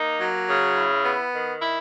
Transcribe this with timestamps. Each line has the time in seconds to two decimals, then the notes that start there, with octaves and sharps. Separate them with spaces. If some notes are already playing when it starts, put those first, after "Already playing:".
Already playing: A#3 D#4
0.20 F#3
0.48 C#3
0.76 E4
1.04 B3
1.33 D#3
1.61 E4